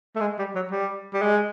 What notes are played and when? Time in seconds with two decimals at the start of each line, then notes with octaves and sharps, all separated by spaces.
0.15 A3
0.21 G#3
0.39 G3
0.55 F#3
0.71 G3
1.14 G3
1.22 G#3